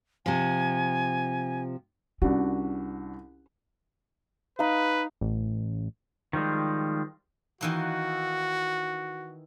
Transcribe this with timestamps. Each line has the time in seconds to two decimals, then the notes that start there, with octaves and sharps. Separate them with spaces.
0.26 C3 F3 G#5
2.22 C2 C#4 D4 F#4
4.59 D#4 B4 F5
5.21 A1
6.33 D#3 F3 G3 G#3
7.61 D#3 E3 A#3 F#4